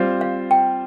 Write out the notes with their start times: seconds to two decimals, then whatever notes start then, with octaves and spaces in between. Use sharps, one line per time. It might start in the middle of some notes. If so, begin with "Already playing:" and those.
Already playing: G3 C4 F4 C5
0.21 F5
0.51 G5